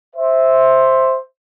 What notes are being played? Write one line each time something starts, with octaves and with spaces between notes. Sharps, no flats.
C5 E5